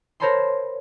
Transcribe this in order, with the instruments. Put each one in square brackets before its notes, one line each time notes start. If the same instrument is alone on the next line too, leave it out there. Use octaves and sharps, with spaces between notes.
[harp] A#4 C5 C#5 A5 B5 C6